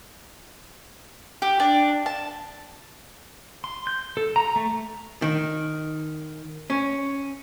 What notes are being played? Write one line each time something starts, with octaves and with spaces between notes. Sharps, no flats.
G4
D4
A5
C6
G6
A4
A#5
A3
D#3
C#4